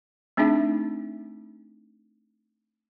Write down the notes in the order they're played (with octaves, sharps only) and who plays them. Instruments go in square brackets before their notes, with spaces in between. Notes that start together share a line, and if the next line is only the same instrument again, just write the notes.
[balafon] A3 C4 D4 D#4 G#4 E5